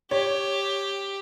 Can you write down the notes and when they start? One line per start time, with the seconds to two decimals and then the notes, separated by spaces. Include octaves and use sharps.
0.11 G4 C#5